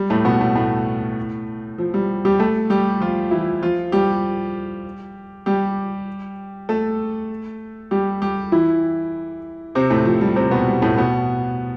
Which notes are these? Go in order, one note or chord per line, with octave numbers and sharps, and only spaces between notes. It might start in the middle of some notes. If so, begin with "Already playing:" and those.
Already playing: G3
A2 A3
B2 B3
A2 A3
A2 A3
F3
G3
G3 G4
A3 A4
G3 G4
F3 F4
E3 E4
F3 F4
G3 G4
G3 G4
A3 A4
G3 G4
G3 G4
E3 E4
C3 C4
A2 A3
F3
G3
C3 C4
B2 B3
G3
A2 A3
B2 B3